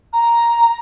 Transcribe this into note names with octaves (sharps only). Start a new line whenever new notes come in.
A#5